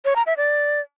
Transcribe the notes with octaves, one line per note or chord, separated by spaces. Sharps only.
C#5
A#5
E5
D5